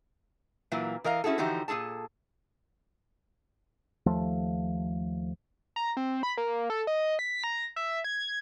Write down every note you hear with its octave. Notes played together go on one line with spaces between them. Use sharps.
A#2 E3 F#3 A#3
E3 A#4 D#5 F5
C#4 E4 F#4 G#4 A4
D3 E3 F3 D#4 F#4 G4
A#2 D#4 G#4 A4 A5
D#2 F3 A3
A#5
C4
B5
A#3
A4
D#5
B6
A#5
E5
G#6